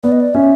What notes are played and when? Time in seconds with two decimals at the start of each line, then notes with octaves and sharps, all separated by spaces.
0.04 B3 D5
0.12 D#5
0.20 D5
0.34 C#4 E5